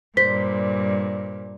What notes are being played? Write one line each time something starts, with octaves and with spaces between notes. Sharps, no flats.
G2 A#2 C5 B6